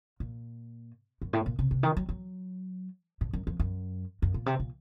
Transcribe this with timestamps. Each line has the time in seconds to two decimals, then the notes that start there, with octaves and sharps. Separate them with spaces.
0.20 A#2
1.22 F#2
1.33 A2
1.46 A#2
1.59 C3
1.71 C3
1.83 D#3
1.97 F#3
2.09 F#3
3.21 A2
3.33 F#2
3.47 F2
3.60 F#2
4.22 F#2
4.34 A#2
4.46 C3
4.60 A#2